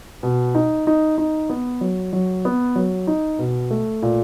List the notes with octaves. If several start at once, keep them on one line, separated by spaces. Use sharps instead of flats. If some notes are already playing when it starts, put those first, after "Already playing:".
B2
D#4
D#4
D#4
B3
F#3
F#3
B3
F#3
D#4
B2
A3
A#2